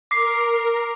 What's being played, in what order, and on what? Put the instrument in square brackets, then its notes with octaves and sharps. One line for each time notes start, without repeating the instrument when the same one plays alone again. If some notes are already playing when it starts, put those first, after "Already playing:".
[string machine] A#4 [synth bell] D6 C7